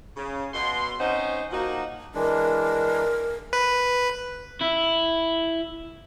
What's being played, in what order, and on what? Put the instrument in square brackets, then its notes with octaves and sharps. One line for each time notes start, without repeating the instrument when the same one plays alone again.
[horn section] C#3
B2 C6
C4 C#4 D#4 C5 D#5 F#5
F3 A#3 D#4 F#4
[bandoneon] E3 G#3 D4 [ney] A#4
[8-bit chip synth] B4
[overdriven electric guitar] E4